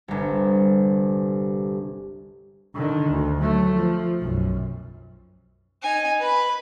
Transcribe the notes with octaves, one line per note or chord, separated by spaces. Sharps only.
G1 C2
D3 D#3
D2
F#3 A3
F3
B1 F#2
D#4 G#5
B4 B5